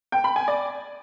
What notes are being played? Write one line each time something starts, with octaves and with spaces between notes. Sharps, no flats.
G5
B5
G#5
D5